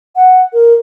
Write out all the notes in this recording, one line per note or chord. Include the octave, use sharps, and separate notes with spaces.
F#5
A#4